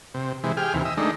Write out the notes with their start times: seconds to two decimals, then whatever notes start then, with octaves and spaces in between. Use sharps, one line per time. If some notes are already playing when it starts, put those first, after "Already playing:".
0.14 C3
0.44 C3 E3 G#3
0.57 G4 G#4 F6
0.74 D#2 C3 E3
0.85 D#5 E5
0.97 D#3 G#3 A3 D4 D#4